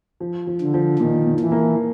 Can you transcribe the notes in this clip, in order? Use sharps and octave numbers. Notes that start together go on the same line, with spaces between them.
F3
F3
D3
F3
A#2 D#3
A#2
E3
A#3